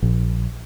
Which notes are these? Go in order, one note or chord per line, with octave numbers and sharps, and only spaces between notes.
A#1